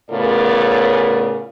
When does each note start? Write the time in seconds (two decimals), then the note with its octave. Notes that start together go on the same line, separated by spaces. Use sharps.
0.11 A2 C#3 B3 F4 A#4 D5